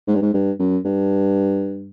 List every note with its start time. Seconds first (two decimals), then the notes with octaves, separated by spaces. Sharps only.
0.08 G#2
0.15 G2
0.22 G#2
0.34 G2
0.59 F#2
0.85 G2